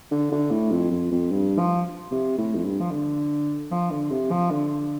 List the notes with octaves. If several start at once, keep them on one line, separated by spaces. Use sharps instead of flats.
D3
D3
A2
F2
F2
F2
G2
F3
C3
A2
F2
G2
F3
D3
F3
D3
C3
F3
D3